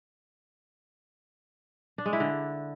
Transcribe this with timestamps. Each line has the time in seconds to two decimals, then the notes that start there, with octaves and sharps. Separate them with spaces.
1.98 D4
2.06 G#3
2.13 E4
2.20 D3